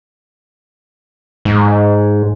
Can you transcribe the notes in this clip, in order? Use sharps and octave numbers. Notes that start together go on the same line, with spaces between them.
G#2